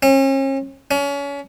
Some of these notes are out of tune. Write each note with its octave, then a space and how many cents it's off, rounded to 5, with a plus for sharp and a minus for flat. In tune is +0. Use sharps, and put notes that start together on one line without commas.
C#4 -40
C#4 +30